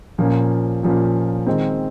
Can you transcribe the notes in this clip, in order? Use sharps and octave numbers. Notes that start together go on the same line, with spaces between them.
A#2 F3 A#3 C#4
A#2 F3 A#3 C#4
D#3 G#3 C4